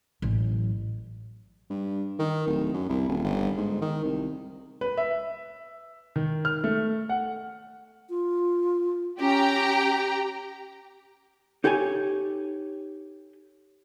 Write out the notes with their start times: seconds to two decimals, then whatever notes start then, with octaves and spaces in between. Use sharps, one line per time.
0.22 A1 F#3
1.70 G2
2.19 D#3
2.47 D1
2.73 F#2
2.89 C2
3.08 D#1
3.24 G1
3.57 G#2
3.81 D#3
4.04 C2
4.81 B4
4.97 E5
6.16 D#3
6.45 F6
6.64 A3
7.09 F#5
8.10 F4
9.20 C#4 G4 G5 A#5
11.64 D#4 G4 A4 C#5 G#5